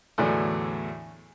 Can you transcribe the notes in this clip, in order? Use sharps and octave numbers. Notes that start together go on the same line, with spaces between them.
E2 A2 D3 E3 F#3 D4